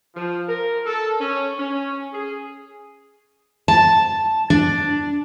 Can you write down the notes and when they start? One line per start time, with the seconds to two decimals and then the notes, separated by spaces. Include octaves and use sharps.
0.15 F3
0.49 A#4
0.86 A4
1.20 C#4
1.59 C#4
2.13 G#4
3.68 A5
4.50 D4